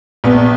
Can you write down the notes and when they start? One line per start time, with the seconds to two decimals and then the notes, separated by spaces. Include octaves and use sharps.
0.24 A#1 B3